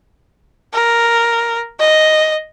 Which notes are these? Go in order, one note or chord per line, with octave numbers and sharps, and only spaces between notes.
A#4
D#5